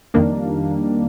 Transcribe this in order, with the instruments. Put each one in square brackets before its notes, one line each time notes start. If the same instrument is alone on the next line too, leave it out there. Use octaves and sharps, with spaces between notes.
[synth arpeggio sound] F2 D#3 G3 A#3 D4